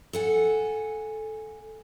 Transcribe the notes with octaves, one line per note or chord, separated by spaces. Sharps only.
A4 F#5 G#5